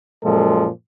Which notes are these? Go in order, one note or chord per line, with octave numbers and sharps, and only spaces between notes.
F#2 A#2 F3 G#3 A4